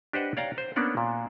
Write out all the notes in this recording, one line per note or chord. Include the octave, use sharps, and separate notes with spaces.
D4 G4 B4 C5 D#5 F#5
C#5 D5 F5 G5 A#5
C5
A#3 B3 C#4 D4 D5 F#5
A#2